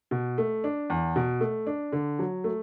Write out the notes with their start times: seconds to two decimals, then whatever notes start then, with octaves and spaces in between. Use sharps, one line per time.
0.11 B2
0.38 A3
0.64 D4
0.90 E2
1.16 B2
1.41 A3
1.67 D4
1.92 D3
2.19 F#3
2.44 A3